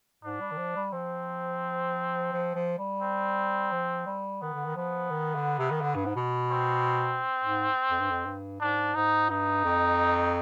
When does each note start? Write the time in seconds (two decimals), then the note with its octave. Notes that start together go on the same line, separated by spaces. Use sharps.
0.24 G#2 D4
0.40 G3
0.51 D#3
0.57 F3
0.76 G3
0.92 F3 C4
2.33 F3
2.55 F3
2.78 G3
3.01 C4
3.72 F3
4.06 G3
4.42 D#3 B3
4.54 D3
4.65 D#3
4.76 F3 B3
5.11 D#3
5.35 D3
5.58 C3
5.71 D#3
5.81 D3
5.95 G2
6.05 G#2
6.16 B2
6.50 C4
7.44 G#2
7.91 F2
8.00 G2
8.10 F2
8.26 G2
8.60 G#2 D4
8.95 G#2 D#4
9.29 G2 D#4
9.64 F2